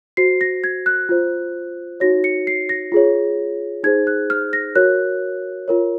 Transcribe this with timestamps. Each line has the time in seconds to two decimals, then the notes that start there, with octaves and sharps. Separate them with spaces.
0.17 F#4 C5 C7
0.41 A#6
0.64 G#6
0.86 F#6
1.09 F4 C5
2.00 D#4 F#4 C#5 A#6
2.24 C#7
2.47 C7
2.69 A#6
2.92 F4 G#4 C#5
3.84 D#4 G#4 C5 G#6
4.07 F#6
4.30 F6
4.53 A#6
4.75 F#4 A#4 C#5 F#6
5.68 F4 A#4 C#5